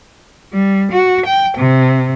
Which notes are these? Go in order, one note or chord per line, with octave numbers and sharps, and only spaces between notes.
G3
F#4
G5
C3